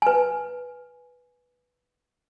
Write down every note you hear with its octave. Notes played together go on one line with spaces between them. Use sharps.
B4 G#5